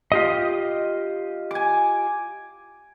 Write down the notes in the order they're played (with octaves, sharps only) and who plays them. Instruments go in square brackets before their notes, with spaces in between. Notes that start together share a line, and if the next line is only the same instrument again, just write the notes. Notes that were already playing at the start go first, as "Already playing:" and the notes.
[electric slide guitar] F4 G4 D#5
[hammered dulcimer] G#5 D6